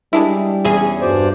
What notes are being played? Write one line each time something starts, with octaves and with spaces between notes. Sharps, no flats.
G3 G#3 D4 E4
E2 C#4 G#4
G2 F#4 C5 D5